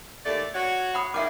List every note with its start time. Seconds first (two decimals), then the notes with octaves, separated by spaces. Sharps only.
0.25 D#2 A3 D5
0.54 F#4 C#5
0.94 F#5 B5 D#6
1.14 E2 D#3 E5 F#5 D6